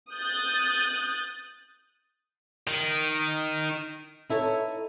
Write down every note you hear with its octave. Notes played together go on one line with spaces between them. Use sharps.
D#6 F#6 G6 A6
D#3
D#4 E4 A4 C#5